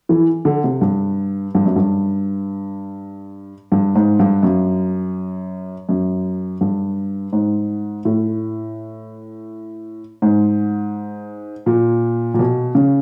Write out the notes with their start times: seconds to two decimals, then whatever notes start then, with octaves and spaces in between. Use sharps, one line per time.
0.09 E3
0.45 D3
0.64 C3
0.81 G2
1.55 G2
1.65 F#2
1.76 G2
3.72 G2
3.95 G#2
4.19 G2
4.43 F#2
5.89 F#2
6.61 G2
7.33 G#2
8.05 A2
10.22 G#2
11.66 A#2
12.34 A#2
12.39 B2
12.75 C#3